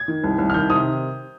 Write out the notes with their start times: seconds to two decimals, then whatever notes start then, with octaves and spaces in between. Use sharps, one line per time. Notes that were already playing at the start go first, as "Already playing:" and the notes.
Already playing: G#6
0.08 D#3
0.24 C2
0.38 C2
0.50 F6
0.54 D#3 G6
0.70 C3 D#6